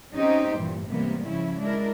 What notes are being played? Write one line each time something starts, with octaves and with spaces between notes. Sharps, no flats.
C4 C#4 D#4 G4 C5
G2 A#2 E3
G#2 C3 E3 G3 A#3 B3
C#3 F3 C#4 E4
G#3 D4 E4 A#4